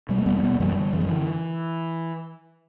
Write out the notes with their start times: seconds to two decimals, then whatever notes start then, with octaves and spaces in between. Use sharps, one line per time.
0.09 B2 G3
0.18 A3
0.25 E2 G3 B3
0.36 C4
0.43 B2 G3 B3
0.60 F#2 E3 G3
0.77 D3
0.93 F#2 E3
1.01 F#3
1.09 D3 E3